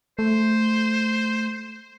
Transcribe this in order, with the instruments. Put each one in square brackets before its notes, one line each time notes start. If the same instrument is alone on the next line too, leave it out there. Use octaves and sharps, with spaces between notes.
[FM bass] A3 [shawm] C5